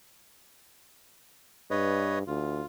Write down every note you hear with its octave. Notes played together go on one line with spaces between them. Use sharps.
G2 B4 C#5 D#5
D2 F4